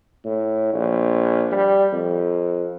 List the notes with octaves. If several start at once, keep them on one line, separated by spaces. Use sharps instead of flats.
A2
A#1
G3
F2